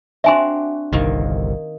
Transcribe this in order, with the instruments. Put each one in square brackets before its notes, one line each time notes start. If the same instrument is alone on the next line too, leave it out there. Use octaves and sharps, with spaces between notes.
[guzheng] C4 D4 F#4 [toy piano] E5 G#5 C6
[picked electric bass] G1 C2 [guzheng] D#3 A#3